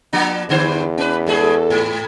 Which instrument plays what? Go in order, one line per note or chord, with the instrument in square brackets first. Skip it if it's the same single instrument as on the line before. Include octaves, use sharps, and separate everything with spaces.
[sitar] F3 A#3 D4
[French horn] E2 [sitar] G2 D3 C5
[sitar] C#4 B4
[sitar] G2 G#3 G#4 [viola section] A4
[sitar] G#2